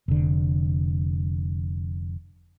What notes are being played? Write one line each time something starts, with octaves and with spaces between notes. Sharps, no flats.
F1 D3